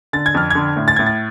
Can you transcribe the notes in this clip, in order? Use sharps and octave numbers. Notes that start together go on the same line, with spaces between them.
D3 A6
G#6
F2 F6
D3 G#6
A2
A6
A2 G#6
A6